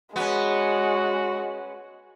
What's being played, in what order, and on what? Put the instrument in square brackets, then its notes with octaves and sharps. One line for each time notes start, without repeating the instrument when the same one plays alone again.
[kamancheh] G#3 [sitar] B3 C#4 [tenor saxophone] F#4